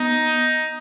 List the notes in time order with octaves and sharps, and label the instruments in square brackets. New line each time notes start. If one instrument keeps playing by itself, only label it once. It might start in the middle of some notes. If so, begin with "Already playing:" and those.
Already playing: [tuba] B3 [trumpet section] D#4